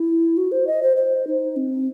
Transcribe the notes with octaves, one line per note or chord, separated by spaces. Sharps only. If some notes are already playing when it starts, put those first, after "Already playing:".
Already playing: E4
F#4
C5
D#5
C5
C5
D#4
C4